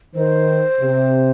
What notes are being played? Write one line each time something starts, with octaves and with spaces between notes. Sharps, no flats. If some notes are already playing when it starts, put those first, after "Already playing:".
D#3 C5
C3